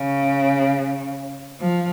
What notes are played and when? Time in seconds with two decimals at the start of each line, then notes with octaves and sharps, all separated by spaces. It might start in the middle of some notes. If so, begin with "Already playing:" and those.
Already playing: C#3
1.60 F3